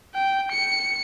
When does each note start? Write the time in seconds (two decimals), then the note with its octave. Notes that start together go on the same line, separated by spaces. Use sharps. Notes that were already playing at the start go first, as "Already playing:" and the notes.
0.15 G5
0.52 C#7